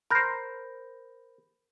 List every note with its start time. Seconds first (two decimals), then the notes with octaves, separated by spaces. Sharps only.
0.11 A#4 C5 B5 G6 A#6